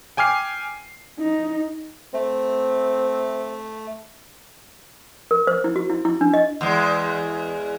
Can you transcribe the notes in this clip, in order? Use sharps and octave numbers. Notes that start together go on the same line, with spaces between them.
G5 G#5 D6 F6 C7
D#4
A3 C4
A#4
C5
E4
F#4
E4
E4
D4
D#5
E2 G#3